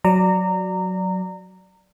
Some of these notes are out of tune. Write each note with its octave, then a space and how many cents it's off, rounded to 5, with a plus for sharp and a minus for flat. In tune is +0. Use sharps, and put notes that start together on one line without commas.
F#3 +0 D5 +0 A#5 -20